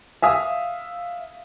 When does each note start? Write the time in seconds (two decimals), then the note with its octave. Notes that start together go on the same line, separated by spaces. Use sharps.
0.22 E5 F5 D#6